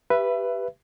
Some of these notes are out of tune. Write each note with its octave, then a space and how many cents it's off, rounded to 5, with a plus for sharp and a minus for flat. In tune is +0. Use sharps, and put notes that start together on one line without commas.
G4 +0 B4 +0 E5 +25